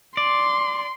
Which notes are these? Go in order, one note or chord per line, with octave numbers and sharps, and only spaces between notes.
D5 C6